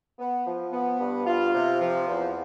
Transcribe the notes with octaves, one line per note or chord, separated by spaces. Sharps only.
B3
F3
B3
G2
F4
C3
F3
E2